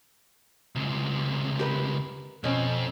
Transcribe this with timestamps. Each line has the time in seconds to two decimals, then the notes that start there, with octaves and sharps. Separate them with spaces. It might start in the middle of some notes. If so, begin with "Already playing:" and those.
0.76 C#2 C3
1.60 G4 A#4 B4
2.44 F2 B2 C4 C#4